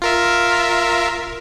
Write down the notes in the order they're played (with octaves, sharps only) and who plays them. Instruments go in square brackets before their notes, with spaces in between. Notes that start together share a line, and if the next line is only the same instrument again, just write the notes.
[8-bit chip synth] F4 A#4 E5